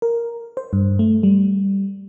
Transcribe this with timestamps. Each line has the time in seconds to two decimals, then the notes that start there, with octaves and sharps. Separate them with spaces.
0.02 A#4
0.57 C5
0.73 G2
0.99 A3
1.23 G3